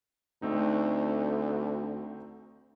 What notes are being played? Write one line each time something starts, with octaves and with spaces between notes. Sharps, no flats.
D2 A3 C4 D#4